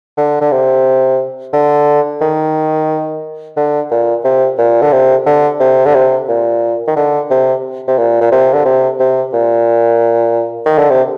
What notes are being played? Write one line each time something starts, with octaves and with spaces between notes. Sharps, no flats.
D3
D3
C3
D3
D#3
D3
A#2
C3
A#2
D3
C3
D3
C3
D3
C3
A#2
D#3
D3
C3
C3
A#2
A#2
C3
D3
C3
C3
A#2
D#3
D3
C3